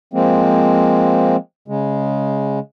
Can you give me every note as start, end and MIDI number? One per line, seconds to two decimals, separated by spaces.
0.14 1.36 53
0.14 1.36 56
0.14 1.36 58
0.14 1.36 60
1.68 2.59 49
1.68 2.59 56